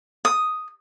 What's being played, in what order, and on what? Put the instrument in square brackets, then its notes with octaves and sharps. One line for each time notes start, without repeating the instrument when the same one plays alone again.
[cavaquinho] D#6